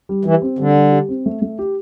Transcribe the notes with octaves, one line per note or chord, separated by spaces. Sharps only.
G3
E3 G4
C4
D3 G3
G3
G4
C4
A3
A3
G4